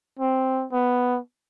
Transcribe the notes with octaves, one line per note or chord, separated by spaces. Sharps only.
C4
B3